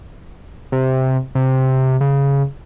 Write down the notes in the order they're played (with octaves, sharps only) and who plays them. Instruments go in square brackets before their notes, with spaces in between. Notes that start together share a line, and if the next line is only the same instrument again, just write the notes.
[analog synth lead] C3
C3
C#3